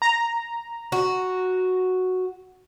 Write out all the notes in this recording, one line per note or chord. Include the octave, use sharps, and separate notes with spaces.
A#5
F#4